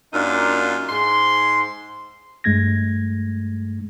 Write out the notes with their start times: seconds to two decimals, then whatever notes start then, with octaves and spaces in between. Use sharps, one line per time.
0.13 F#2 A#3 D4 D#4 F4
0.89 G#2 C6
2.44 G2 G#3 A3 G#6 A#6